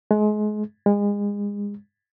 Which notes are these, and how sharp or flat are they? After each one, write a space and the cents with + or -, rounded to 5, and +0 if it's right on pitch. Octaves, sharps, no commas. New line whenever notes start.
G#3 +30
G#3 -30